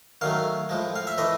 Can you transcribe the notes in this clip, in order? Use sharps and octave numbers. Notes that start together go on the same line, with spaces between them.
D#3 F#3 A3 F5
A2 F3 G#3
F5
E5
A2 E3 A3 D#5